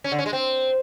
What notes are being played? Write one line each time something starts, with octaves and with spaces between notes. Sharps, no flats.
C#4
D3
C#4
G#3
C4